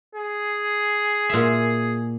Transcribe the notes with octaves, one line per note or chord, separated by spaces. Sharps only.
G#4
A#2 E5